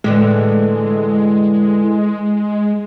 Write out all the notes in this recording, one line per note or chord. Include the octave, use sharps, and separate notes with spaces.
A2 D3 E3 G#3